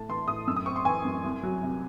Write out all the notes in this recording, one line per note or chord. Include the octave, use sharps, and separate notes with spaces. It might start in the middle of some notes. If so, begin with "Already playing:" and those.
Already playing: A2 A3 A5
E3 C6
A2 D#6
F#2 E6
D#6
C4 C#6
C6
E3 G#5
F#2
C2
F#3
C3